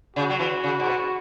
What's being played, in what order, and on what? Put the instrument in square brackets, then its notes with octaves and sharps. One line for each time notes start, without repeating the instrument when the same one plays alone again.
[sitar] C#3 [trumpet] F#4
[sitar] F#3
E3
C#3
G#2
B2